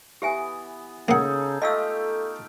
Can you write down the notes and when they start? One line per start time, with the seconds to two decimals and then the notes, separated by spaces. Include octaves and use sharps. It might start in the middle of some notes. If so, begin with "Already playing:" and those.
0.22 E3 B3 G4 E5 G#5
1.08 C#3 A#3 D#4 G#4 A4 F#5
1.62 A3 F4 G4 A4 D#5 F5 E6